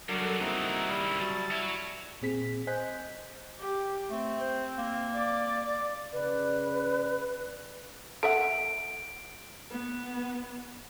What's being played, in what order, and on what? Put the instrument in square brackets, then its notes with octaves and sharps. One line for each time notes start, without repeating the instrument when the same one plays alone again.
[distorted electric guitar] G2 C#3 [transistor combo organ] F#3 D4 [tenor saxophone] A#4
[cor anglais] A4
[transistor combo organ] A#3 C4 F#4 [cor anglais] D#4 [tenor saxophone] E4
[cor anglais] G3
[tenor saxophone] F#3 [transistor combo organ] A5
[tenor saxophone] E4 [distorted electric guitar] F#4 C#5
[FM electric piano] A#2 C4 G#4 B6
C5 D#5 G#5 F#6 G6 B6
[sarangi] G4
[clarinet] A3 [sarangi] C4
[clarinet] C5
A#3
[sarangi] D5
D5
[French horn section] C#3 D5 [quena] B4
[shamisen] A4 E5 F#5 [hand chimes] D7
[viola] B3